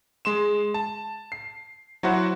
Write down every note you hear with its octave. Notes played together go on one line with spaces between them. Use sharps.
G#3 C6 E7
A5
C7
F#3 E4 F#4 C5 F#5